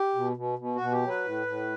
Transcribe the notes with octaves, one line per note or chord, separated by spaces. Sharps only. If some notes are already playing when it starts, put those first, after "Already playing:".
Already playing: G4
B2
B2
B2
F#4
B2
G4
F#3
B4
A2
A2